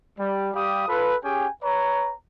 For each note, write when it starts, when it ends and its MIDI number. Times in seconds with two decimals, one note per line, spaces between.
0.19 0.49 55
0.54 0.88 55
0.54 0.88 67
0.54 0.88 77
0.54 0.88 83
0.54 0.88 87
0.88 1.16 65
0.88 1.16 69
0.88 1.16 71
1.23 1.48 61
1.23 1.48 67
1.23 1.48 68
1.23 1.48 79
1.23 1.48 80
1.63 2.13 71
1.63 2.13 73
1.63 2.13 82